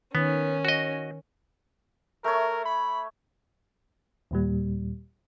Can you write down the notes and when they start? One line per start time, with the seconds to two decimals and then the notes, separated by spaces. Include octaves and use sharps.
0.15 D#3 B3 C#4
0.65 F#4 D#5
2.24 A3 A#4 C#5
2.65 B5
4.31 D#2 A#2 G3